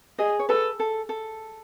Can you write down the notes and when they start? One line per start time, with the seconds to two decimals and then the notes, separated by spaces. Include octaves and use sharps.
0.19 G#4 D#5
0.39 C#5
0.49 A4 B4
0.80 A4
1.09 A4